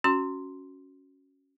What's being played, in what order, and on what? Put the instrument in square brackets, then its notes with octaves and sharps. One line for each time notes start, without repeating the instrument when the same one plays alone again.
[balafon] C#4 F#4 C6